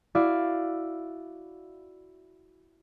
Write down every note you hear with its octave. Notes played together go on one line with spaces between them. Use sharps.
E4 F#4 D5 F5